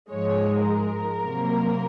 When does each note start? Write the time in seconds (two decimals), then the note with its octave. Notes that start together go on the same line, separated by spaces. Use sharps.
0.12 G#2 F3 G#3 C#5
0.67 A#4
1.24 C3 F#3 A#3